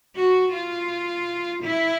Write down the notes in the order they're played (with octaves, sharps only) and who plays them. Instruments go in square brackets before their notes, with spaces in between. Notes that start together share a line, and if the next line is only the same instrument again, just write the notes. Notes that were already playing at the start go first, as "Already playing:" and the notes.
[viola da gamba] F#4
F4
E4